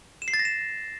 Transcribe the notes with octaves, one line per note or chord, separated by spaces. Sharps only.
E7
C7
A6
A#6
E7